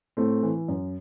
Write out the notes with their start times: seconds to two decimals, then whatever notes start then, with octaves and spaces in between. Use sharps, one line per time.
0.17 A2 A3 C4
0.43 E3
0.68 F#2